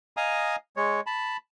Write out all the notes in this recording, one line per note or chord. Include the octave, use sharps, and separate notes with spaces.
D#5 F5 G#5 A#5 D#6
G#3 C#5
A5 B5